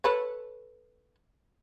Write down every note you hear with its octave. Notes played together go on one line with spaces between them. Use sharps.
A4 B4 C#5